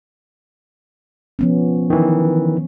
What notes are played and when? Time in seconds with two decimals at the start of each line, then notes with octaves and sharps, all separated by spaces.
1.39 F3 B3 C#4
1.90 D#3 E3